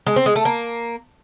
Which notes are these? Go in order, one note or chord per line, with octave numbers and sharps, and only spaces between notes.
G#3
C4
G#3
A3
A#3